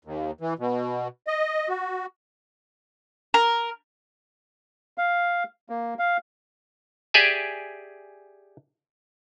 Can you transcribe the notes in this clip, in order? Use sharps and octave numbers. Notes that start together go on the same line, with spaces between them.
D#2
E3
B2
D#5
F#4
A#4
F5
A#3
F5
G4 G#4 D5 E5 G#5